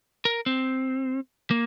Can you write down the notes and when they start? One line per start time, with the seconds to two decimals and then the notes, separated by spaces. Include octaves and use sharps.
0.25 A#4
0.46 C4
1.51 A#3